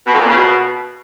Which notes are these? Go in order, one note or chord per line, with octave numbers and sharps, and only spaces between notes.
B2
F2
A#2
C#3
B2